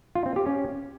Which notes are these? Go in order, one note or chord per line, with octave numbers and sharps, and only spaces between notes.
F4
C4
G4
C#4